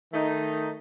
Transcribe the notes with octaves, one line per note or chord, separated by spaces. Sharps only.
D#3 A3 D#4